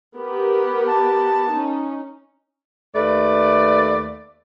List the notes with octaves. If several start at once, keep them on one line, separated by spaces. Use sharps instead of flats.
B3 G4 A#4
A5
C#4 D#4
D#2 A3 B4 D5